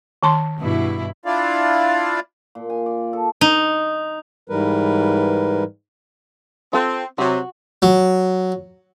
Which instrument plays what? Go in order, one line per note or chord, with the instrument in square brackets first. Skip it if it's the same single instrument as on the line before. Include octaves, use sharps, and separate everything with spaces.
[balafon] D#3 A5 C6
[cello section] G2 B2 E4
[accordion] D4 E4 F4 D5 F5
[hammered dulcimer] A#2
G#5
D5
A4
[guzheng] D#4
[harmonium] G#2 E3 G3 A#4 B4
[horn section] C4 [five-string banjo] F4 A4
[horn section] C3 F#3 [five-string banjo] F#4
[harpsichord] F#3